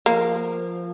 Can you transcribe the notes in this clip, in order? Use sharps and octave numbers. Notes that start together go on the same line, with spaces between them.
F3 A#3